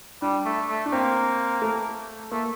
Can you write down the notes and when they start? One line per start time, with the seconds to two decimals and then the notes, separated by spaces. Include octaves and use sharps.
0.22 G3 D4
0.46 A3
0.69 A3
0.86 D4
0.92 A#3 C4
1.62 A3
2.31 A3 A#3